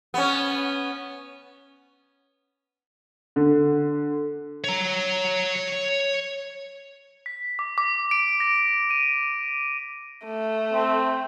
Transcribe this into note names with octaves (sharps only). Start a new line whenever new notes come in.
B3 C#4
D3
C#5 A#5
B6
D6
D6
D7
A#6
D#7
A3
C4